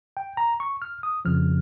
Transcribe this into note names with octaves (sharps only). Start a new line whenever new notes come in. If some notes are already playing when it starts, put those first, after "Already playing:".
G5
A#5
C#6
F6
D#6
F2 C#3 F3 F6